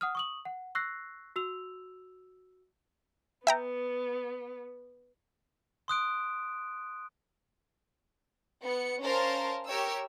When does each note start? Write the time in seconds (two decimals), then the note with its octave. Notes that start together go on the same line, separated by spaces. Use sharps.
0.01 F#5 D#6 F6
0.15 C#6 D#6 F#7
0.45 F#5
0.75 C#6 E6 F#6 A#6 C7
1.36 F#4 E6 F7
3.47 B3 E5 G5 A#5
5.88 C6 D#6 F#6 D7
8.64 B3 C#7
9.02 C#4 A#4 C5 F5 A5 C6
9.68 G4 A#4 C#5 G5 E6